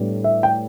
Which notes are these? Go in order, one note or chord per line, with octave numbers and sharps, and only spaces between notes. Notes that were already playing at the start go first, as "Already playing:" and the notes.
Already playing: A2 G3 B3 D4
E5
G5